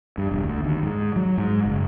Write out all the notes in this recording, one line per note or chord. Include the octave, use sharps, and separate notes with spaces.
G2
E1
D2
D#2
G#2
F#3
G#2
F#1